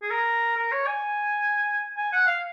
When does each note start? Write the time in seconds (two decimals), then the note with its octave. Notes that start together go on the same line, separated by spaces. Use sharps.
0.02 G#4
0.10 A#4
0.57 A#4
0.72 C#5
0.87 G#5
1.97 G#5
2.13 F#5
2.27 F5